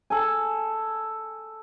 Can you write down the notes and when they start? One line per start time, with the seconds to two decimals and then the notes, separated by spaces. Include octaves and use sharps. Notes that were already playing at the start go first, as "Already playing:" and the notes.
0.10 A4 G#5